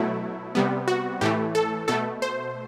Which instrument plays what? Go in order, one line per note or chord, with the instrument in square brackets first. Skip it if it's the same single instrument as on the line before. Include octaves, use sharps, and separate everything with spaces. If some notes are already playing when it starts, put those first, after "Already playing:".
Already playing: [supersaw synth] B2 F#3 A3 E4
C3 G3 B3
F#4
A2 E3 A3 G4
A4
B2 A3 A4
C5